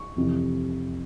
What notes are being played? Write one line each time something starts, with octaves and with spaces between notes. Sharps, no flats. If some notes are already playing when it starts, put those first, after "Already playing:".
Already playing: C#6
F2 C3 E3